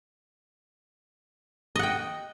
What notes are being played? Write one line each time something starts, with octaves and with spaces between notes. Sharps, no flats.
D#5 F#5 G5